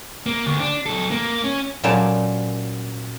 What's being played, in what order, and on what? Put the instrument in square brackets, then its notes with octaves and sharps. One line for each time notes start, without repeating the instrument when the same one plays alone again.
[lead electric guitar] A#3
D2
D4
F#3 A4
A#3
C#4
[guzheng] A#2 F#3 C#4 C5 D5 A5